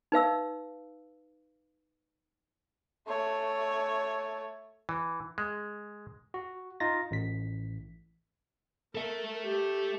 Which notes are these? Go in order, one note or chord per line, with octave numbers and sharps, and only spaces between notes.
D#4 B4 F5 E6
A3 C#5
E3
G#3
F#4
D#4 F4 A6 A#6
A1 B6
A4 A#4 E5
G4